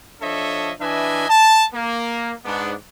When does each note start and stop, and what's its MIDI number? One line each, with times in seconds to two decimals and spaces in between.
0.22 0.72 53
0.22 0.72 62
0.22 0.72 69
0.22 0.72 73
0.22 0.72 75
0.22 0.72 76
0.81 1.28 52
0.81 1.28 62
0.81 1.28 71
0.81 1.28 75
0.81 1.28 76
0.81 1.28 80
1.29 1.64 81
1.73 2.33 58
2.45 2.73 44
2.45 2.73 59
2.45 2.73 62